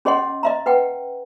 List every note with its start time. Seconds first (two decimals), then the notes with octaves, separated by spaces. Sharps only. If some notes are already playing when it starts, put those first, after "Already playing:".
0.05 C#4 G#4 C#5 D#5 F#5 C6
0.43 D#5 E5 A#5
0.66 B4 F#5 G5